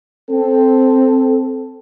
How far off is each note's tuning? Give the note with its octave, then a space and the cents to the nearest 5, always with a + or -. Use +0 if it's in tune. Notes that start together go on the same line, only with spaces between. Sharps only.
C4 +0 A4 -5